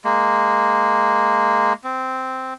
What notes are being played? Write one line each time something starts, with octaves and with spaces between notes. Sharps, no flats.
G#3 A#3
C4